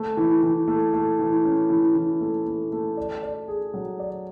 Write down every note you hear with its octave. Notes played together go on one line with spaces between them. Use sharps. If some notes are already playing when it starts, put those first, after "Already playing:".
Already playing: A3
E3
E3
A3
A3
E3
C#4
E3
E3
A3
A3
A3
D5
D5
G#4
F#3
D5